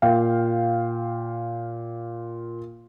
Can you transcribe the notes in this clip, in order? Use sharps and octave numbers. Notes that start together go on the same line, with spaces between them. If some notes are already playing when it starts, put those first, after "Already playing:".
A#2 F5 G5